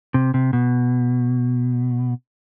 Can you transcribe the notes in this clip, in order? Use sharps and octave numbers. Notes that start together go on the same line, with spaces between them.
C3
C3
B2